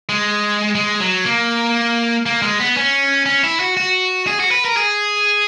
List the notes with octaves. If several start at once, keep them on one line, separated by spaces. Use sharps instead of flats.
G#3
G#3
F#3
A#3
A#3
G#3
B3
C#4
C#4
E4
F#4
F#4
G#4
F#4
B4
A#4
G#4